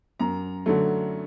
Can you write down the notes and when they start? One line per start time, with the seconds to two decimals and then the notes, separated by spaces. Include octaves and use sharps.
0.20 F#2 A#5
0.66 D3 F#3 A3